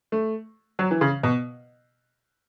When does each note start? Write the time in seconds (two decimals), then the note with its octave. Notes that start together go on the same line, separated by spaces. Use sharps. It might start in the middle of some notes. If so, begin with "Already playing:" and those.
0.12 A3
0.79 F#3
0.91 E3
1.01 C#3
1.23 B2